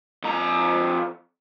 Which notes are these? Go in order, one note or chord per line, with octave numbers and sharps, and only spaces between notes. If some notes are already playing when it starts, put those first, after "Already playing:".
F2 A#5